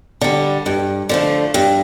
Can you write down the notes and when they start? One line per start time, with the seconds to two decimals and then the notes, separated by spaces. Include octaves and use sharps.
0.21 D3 G3
0.66 G2
1.09 D3 F3 A3
1.54 G2